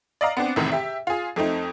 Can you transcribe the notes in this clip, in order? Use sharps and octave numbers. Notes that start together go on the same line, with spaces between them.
D5 D#5 F5 A#5
B3 C4 D4
A1 E2 A2 C3 D#3
G4 E5
F4 G#4
F2 A3 C4 D#4